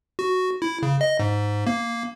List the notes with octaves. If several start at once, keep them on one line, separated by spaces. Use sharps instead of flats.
F#4
E4
C#3
D#5
G#2
A#3